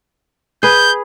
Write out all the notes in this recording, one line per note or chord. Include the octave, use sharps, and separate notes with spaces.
G#4 B4 G6